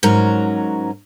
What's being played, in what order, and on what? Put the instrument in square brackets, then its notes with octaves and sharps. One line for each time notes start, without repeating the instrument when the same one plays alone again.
[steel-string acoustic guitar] G#2 F#3 C#4 A#4 A#5